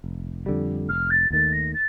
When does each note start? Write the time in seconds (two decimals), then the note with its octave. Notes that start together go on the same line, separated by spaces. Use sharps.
0.04 F1
0.46 F2 D3 G3
0.89 F1 F6
1.10 A6
1.30 D#2 D#3 A3 A6
1.52 A#6
1.73 A6